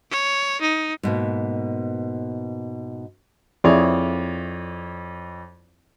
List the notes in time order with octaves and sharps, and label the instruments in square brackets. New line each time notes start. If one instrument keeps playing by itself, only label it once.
[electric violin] C#5
D#4
[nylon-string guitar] G#2 B2 A#3
[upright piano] F2 C#5 D5 [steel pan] C4 E4 G#4